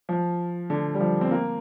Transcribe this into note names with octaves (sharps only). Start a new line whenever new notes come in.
F3
D3
G3
F3
C4
A#3